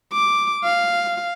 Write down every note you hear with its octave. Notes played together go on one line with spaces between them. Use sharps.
D6
F5